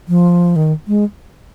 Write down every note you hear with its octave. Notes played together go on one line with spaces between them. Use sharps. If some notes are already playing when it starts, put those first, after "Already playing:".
F3
D#3
G#3